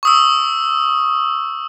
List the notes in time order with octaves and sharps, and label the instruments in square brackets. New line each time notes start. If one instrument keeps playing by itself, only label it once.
[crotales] C#6 D#6 E6